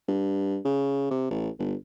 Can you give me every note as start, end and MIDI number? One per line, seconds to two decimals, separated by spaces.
0.08 0.58 43
0.65 1.06 49
1.11 1.29 48
1.31 1.49 33
1.59 1.75 31